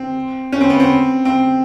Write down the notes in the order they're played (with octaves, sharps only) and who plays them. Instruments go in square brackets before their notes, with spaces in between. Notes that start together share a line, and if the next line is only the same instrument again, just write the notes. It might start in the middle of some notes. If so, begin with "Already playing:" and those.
Already playing: [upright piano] C4
C#4
C4
B3
C4
C4